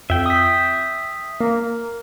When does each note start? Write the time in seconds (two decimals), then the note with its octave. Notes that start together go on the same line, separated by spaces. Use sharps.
0.10 F2 E5 G5
0.26 D#6 B6
1.40 A#3 A#4